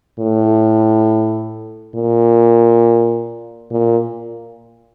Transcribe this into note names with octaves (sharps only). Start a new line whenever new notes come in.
A2
A#2
A#2